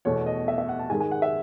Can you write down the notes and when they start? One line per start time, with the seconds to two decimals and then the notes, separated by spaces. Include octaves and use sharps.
0.05 E2 B2 A3 C#5
0.26 D#5
0.48 E5
0.58 E5
0.69 F#5
0.79 A5
0.90 G#2 D#3 G#3 G#5
1.00 G#5
1.11 F#5
1.22 E5